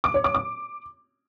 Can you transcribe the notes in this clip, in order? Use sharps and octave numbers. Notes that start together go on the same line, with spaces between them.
D6
C#5
D6
D6